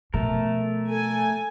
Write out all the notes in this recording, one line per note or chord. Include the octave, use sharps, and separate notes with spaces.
B2 F3 A3 A#4
A4 G#5